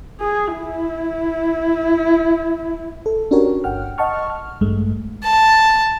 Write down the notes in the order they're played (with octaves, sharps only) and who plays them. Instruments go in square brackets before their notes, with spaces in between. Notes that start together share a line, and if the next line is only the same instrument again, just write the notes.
[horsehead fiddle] G#4
E4
[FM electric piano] A4
C#4 D4 F#4 G4 A#4 C#5
G1 F#5 G5 F6
D#5 F#5 A5 C#6 F6
F6
A1 G2 G#3 A3
[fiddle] A5